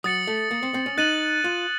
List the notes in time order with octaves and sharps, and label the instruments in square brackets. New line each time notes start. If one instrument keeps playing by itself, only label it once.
[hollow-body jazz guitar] F#3 [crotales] D#6 A6 C#7 F#7
[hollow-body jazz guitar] A3
A#3
C4
C4
C#4
[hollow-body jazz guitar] D#4 [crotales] F#6 A6 D#7 F#7
[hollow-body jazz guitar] F4